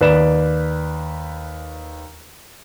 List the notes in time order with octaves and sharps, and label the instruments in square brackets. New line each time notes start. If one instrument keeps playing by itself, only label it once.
[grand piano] D#2 B4 D5 E7